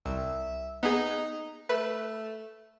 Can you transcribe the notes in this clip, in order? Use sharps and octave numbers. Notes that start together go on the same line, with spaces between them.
C2 E5
B3 D#4 G#4
A3 B4